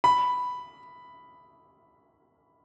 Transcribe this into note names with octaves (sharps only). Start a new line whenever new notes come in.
B5